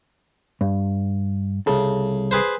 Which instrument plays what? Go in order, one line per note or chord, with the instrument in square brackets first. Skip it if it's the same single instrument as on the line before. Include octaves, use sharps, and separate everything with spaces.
[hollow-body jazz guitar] G2
[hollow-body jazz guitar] C2 A4 [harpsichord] C#3
[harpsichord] G#4 B4 C5